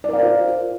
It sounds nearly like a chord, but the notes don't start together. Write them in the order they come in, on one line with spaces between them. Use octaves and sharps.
D5 A#4 F5 C5 F4